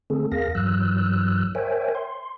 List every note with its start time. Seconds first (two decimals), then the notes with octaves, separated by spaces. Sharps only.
0.10 D3 A3 C4 G#4 A4
0.32 E2 G#4 A#4 F5 A#6
0.55 G2 E3 F#3 E6 F#6
1.55 A#4 C5 C#5 E5 G5 G#5
1.95 C6